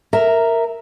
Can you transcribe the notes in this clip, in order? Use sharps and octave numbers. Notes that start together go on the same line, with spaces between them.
A#4 E5 A#5